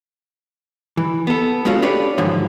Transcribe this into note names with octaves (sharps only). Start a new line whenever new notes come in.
E3
B3 A4
G#3 A3 C#4 F4 F#4
D4 G4 A4 B4 C#5 D5
G#2 D3 D#3 F3 F#3